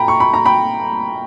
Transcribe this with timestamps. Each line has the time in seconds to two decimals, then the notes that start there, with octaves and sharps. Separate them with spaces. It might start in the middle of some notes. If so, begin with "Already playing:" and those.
Already playing: A#2 G5 A#5 B5
0.08 C#6
0.20 B5
0.34 A#5
0.46 G5 B5